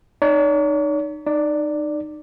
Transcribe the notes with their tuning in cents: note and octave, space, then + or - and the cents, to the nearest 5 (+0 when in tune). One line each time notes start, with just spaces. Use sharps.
D#4 -30 C#5 +45
D#4 -30 D5 +0